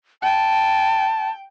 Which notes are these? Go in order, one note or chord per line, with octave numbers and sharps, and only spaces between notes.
G5 A5